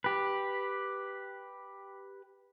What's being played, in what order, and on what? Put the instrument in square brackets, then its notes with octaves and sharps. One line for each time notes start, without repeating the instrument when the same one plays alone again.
[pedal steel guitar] G4 B4